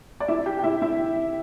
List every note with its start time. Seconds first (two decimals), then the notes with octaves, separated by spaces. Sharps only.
0.20 D5
0.28 E4 E5
0.46 G4 G5
0.59 G5
0.63 E4 E5
0.82 E4 E5